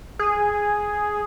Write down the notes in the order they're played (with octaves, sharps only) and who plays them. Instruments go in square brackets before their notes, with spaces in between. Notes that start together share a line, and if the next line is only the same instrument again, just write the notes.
[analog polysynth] G#4